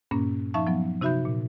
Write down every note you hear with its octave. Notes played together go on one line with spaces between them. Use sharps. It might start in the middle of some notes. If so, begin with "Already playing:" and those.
G2 A#2 A#3 C#4
F3 D#4 E5 F5 A5 C#6
F3 F#3 B3
C3 D#4 F#4 E5 B5 G6
A#2